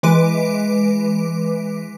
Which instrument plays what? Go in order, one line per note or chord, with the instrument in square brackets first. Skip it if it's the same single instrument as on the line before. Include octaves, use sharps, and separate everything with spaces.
[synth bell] E3 G#3 B4 D6 D7